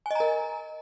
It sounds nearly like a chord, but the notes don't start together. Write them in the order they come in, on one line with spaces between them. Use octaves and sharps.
G#5 D#5 A#5 A#4